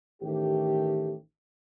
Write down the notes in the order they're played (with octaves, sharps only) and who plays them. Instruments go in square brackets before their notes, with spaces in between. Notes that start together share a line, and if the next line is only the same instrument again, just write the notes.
[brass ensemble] A1 D#3 A3 G4